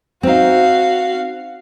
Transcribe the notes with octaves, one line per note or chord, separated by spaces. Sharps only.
C4 D#4 F#4 F5